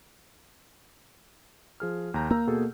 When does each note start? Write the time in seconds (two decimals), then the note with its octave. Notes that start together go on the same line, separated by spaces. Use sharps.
1.80 F3 G#4 F6
2.14 D#2 A#5 G6
2.31 A#3 A#5 E6
2.47 B2 G#4 A4